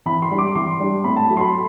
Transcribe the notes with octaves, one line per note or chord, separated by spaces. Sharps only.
E3 B5
C6
G3 D4
D6
E3 C6
G3 D4
A2 B5
A5
F#3 A3
C6
B5